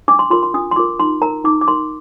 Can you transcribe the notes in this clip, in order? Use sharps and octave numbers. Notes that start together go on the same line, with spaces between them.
D4 D6
C6
F4 A#4 C6
C6
D4 D#6
C6
F4 A#4 D6
D#4 C6
A#4 A#5
D#4 D6
D6
A#4 C6